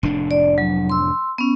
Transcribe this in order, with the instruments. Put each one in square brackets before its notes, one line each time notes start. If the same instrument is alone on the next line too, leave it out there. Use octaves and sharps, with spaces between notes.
[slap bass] F1 A2 D4
[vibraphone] D5
F#3
C6 E6
B3 C#4